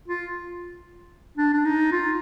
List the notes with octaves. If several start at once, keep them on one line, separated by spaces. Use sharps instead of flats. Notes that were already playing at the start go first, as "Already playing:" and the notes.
F4
D4
D4
D#4
F4